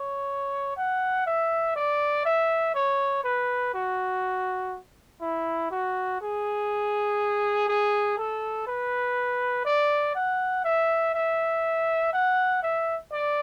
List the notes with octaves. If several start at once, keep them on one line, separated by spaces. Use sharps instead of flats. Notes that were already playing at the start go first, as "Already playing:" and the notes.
Already playing: C#5
F#5
E5
D5
E5
C#5
B4
F#4
E4
F#4
G#4
G#4
A4
B4
D5
F#5
E5
E5
F#5
E5
D5